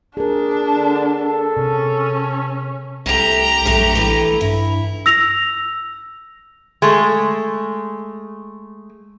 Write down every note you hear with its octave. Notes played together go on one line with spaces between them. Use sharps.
D4 G#4 A#4
D3
A4
C3 C#4
C2 C3 A3 G4 A#5
A#1 F#2 F#3 A3
E3 A3
G2 E4
E6 A#6 F7
G#3 A3